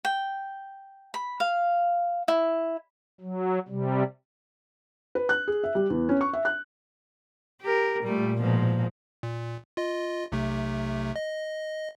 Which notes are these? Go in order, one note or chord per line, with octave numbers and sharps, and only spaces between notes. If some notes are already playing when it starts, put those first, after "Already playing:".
G5
B5
F5
E4
F#3
C3 G3
B4
F#6
G#4
E5
G3
E2
C#4
C#6
E5
F#6
G4 A#4
A#2 G3 A3
G#2 B2 F3
A#2
F4 D#5
B1 C3 A3
D#5